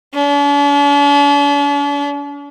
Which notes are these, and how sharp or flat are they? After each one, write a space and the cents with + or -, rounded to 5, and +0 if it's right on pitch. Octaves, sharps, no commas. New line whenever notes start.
D4 -45